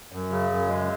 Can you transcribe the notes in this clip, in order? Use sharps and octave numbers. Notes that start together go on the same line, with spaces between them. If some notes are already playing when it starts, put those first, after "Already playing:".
F#2
C#3
F#2
G#3